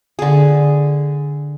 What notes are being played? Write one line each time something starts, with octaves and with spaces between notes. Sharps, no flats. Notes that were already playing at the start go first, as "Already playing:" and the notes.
D3 G#4